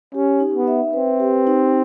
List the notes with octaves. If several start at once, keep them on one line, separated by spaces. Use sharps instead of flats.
C#4 G4
D#4
B3
E5
C4 B4
G4
D#4